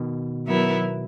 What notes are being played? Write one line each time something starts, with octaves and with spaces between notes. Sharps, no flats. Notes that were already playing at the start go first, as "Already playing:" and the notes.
Already playing: B2 D#3
F#3 B3 E4 A#4 E5